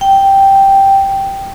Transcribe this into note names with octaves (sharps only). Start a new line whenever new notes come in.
G5